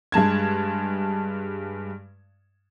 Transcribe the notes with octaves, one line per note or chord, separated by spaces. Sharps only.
G2 G#3 A5 G#6